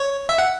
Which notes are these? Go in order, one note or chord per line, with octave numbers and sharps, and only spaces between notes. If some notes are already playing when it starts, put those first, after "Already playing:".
Already playing: C#5
E5
F#5